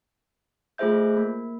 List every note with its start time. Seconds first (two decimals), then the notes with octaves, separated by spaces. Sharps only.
0.78 A3 F4 G#4 C5 E5 G6
1.17 A#3